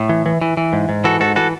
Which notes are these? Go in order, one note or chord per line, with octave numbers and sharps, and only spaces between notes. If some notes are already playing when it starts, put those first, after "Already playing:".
Already playing: A2
E3
E3
E3
E3
G#2
G#2
E3 F#4 A4
G#2 F#4 A4
E3 F#4 A4